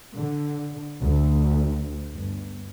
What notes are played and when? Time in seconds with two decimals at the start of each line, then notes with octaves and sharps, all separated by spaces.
0.16 D3
1.01 D2
2.13 G1